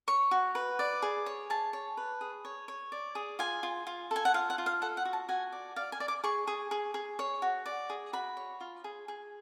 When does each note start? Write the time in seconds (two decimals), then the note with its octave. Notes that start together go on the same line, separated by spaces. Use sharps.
0.08 C#5 C#6
0.31 F#4
0.55 B4
0.79 D5
1.02 G#4
1.26 C#5
1.50 G#4 A5
1.73 C#5
1.97 B4
2.21 G#4
2.45 C#5
2.68 C#5
2.92 D5
3.15 G#4
3.39 F4 G#5
3.63 F4
3.87 F4
4.11 A4 G#5
4.25 F#5
4.34 F4 F5
4.50 F#5
4.58 F4
4.66 F5
4.82 A4 F#5
4.97 F#5
5.05 F#4
5.13 A5
5.29 F#4 G#5
5.52 D5
5.76 D5 F5
5.92 G#5
6.00 D5
6.08 D6
6.24 G#4 C#6
6.47 G#4
6.71 G#4
6.94 G#4
7.19 C#5
7.42 F#4
7.66 D5
7.90 G#4
8.13 F#4 B5
8.37 C#5
8.61 F4
8.84 G#4
9.08 G#4